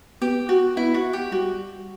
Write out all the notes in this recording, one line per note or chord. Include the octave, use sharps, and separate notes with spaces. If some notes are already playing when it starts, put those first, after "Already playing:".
B3 G4
F#4
B3 E4
F#4
G4
G3 F#4